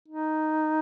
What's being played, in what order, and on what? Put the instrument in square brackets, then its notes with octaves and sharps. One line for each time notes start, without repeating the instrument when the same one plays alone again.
[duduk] D#4